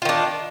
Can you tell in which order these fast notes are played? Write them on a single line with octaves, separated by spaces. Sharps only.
F4 D#3 D4